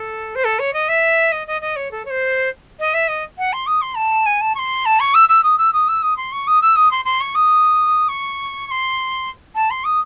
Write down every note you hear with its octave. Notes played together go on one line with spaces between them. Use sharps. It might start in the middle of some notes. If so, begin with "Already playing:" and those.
Already playing: A4
C5
A4
C#5
D#5
E5
D#5
D#5
D#5
C#5
A4
C#5
C5
D#5
E5
D#5
F#5
C6
D#6
C6
A5
G#5
A5
C#6
C6
A5
C#6
E6
E6
D#6
E6
D#6
E6
D#6
C6
C#6
D#6
E6
D#6
C6
C6
C#6
D#6
C#6
C#6
C6
A5
C6
D#6